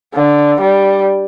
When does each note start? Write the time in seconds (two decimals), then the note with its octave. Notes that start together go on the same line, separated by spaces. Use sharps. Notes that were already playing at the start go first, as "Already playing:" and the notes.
0.15 D3
0.61 G3